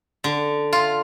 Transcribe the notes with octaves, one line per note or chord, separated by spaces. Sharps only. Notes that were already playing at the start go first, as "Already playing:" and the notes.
D3
F4